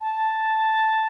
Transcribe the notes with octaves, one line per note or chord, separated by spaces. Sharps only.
A5